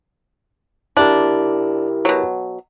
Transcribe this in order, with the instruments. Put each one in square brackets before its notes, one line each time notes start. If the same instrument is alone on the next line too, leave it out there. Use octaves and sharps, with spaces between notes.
[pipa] D4 [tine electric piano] E4 G4 A#4
[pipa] B2 F#3